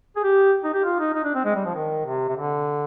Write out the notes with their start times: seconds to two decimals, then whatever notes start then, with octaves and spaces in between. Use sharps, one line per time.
0.16 G#4
0.23 G4
0.64 D#4
0.74 G4
0.84 F4
0.99 D#4
1.14 D#4
1.24 D4
1.35 C4
1.44 G#3
1.56 G3
1.65 F3
1.75 D#3
2.05 C3
2.29 C3
2.36 D3